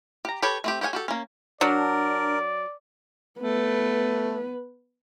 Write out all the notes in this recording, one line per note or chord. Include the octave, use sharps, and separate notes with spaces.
G4 A#5
G4 A4 B4 C#5 A5
A3 C4 G4
G4 A4 C#5 F#5 G#5
F#4 G4 A4
A#3 C#4
F#3 D4 A#4 D5
A3 B3 B4